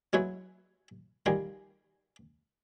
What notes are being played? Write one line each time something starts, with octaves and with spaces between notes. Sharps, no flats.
F#3 G#3 E4 B4 C#5
D#3 F3 G3 G#4 G5